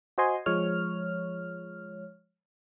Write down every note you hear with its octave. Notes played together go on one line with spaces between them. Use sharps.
F#4 C5 D#5 G#5 C6
F3 G#3 C#5 F6